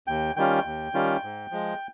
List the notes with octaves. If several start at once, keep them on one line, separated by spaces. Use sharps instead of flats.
D#2 G5
D#3 G3 C#4 F4 G5
D#2
D#3 G3 C#4 F4
G#2
F3 G#3